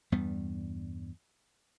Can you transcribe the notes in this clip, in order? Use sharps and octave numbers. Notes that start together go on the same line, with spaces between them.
E2 G2 G3 B3